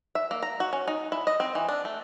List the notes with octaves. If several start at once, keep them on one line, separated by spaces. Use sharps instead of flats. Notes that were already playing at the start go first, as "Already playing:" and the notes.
E5
A#3
A#5
F#4
C#4
D#4
E4
D#5
C4
E3
D4
A3